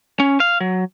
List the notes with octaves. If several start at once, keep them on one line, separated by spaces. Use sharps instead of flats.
C#4
F5
F#3